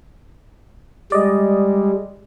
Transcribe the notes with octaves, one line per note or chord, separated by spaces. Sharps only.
G3 G#3 D5 D#5